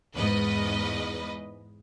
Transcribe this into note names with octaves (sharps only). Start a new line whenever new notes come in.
E2 G#2 B4 D#5